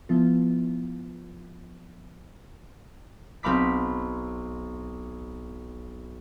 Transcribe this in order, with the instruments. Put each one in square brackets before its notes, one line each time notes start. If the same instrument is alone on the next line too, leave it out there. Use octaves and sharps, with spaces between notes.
[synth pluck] F3 B3 E4 F4
[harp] B1 C4 F5 B5 D6 B6